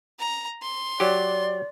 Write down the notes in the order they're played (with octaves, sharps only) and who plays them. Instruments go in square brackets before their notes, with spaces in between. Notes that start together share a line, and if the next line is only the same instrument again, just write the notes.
[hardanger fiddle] A#5
C6
[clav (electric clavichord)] F#3 G4 [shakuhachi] D5